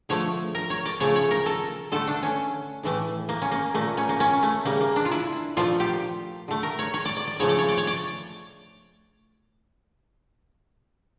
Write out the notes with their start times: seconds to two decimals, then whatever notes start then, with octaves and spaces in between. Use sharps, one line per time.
0.09 D3 F3 A3 C#5
0.55 A#4
0.70 C#5
0.86 D5
1.00 C#3 F3 A3 C#5
1.16 C#5
1.31 A#4
1.46 A4
1.92 D3 A3 A4
2.07 D4
2.23 C#4
2.83 A2 E3 A3
3.29 A#3
3.42 C#4
3.51 A#3
3.74 A#2 A3 A#3
3.97 C#4
4.09 A#3
4.20 C#4
4.43 A3
4.65 C#3 G3 A#3
4.81 A#3
4.96 D4
5.05 F4
5.11 E4
5.57 A#2 F3 A3 F4
5.80 G4
6.48 D3 A3
6.63 A#4
6.79 C#5
6.94 C#5
7.05 D5
7.16 D5
7.27 D5
7.39 C#3 F3 A3 C#5
7.49 D5
7.59 C#5
7.69 D5
7.78 C#5
7.87 D5